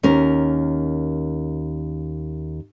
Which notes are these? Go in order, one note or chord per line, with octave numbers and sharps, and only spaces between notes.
D#2 C#4 A#4